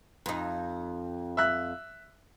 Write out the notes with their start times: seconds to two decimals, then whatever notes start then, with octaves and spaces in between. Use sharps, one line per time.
0.26 F2 D#4
1.37 E5 F#6